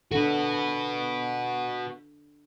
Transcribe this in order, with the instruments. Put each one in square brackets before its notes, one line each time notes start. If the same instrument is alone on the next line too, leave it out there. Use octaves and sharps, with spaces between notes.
[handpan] D4 A4 [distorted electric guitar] F#4 B4